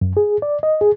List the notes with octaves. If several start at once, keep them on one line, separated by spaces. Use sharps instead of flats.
F#2
G#4
D5
D#5
G#4